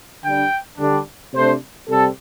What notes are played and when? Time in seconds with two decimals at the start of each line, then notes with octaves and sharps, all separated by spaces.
0.23 D3 G3 D4 G5
0.78 D3 G3 D4
1.33 C3 A3 D4 C5
1.88 C3 G3 C4 A4